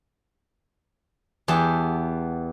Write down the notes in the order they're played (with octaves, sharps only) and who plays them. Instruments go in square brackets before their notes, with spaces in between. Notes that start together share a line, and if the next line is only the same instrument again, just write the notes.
[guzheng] E2 B3 G4 A5